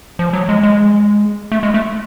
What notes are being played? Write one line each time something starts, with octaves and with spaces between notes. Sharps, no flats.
F3
F#3
G#3
G#3
A3
G#3
A3